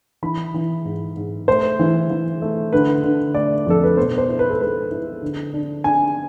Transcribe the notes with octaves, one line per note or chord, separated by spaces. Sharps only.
E3 B5
E3
G#2
G#2
A3 C5
E3
E3
A3
D3 B4
D3
A3 D5
F2 A4
B4
B2 C5
C5
E4
B4
A4
G#3 B4
E4
D3
D4
D4 G#5